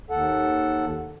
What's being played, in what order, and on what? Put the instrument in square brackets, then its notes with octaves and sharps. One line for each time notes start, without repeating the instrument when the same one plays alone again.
[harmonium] D#2 A4 F#5